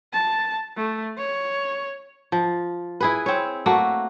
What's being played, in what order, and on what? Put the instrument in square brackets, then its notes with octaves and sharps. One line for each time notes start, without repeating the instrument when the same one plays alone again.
[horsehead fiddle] A5
A3
C#5
[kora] F3
E4 G#4 B4
C4 C#5
A3 A#3 F#4